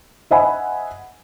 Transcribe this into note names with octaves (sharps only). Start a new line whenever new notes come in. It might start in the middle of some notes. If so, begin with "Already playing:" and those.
C5 D#5 E5 F#5 G#5 B5